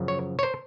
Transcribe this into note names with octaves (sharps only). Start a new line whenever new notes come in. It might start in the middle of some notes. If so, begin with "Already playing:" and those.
Already playing: F#2 C#3 F3
C#5
C#5
C5